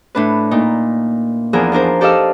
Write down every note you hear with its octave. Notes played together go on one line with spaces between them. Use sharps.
A2 D4 B4
A#2 D#4
E2 F3 D4 G#4 A#4 E6
D4 F4 A#4 C5
G4 A4 D5 D#5 F5 E6